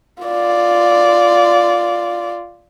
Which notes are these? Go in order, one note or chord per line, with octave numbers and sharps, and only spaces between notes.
F4 D5